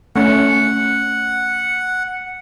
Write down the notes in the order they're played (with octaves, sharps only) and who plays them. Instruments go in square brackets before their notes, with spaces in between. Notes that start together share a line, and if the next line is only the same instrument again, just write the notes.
[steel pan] A3 C#4 [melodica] F#5